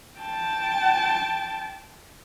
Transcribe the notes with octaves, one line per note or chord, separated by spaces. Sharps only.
G5 A5